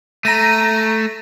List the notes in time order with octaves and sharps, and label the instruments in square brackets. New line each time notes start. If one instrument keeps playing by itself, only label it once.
[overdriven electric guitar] A3 [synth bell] A#5 A#6 D#7